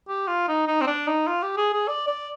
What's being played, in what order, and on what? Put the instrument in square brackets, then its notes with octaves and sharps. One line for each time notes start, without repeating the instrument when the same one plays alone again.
[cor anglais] G4
F4
D#4
D#4
C4
D4
D#4
F4
G4
G#4
G#4
D5
D5